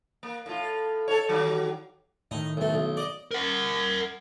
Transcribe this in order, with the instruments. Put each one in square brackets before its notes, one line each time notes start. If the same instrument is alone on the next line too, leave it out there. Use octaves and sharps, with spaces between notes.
[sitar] A#3
A2 F4
A4 C#5
D#3 F#3 G3
[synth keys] A2 D#3 [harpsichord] D#4
[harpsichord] B1 A3
B1
D5 D#5
[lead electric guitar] A#4 F#5